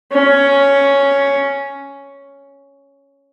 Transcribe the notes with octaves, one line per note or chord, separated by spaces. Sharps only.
C#4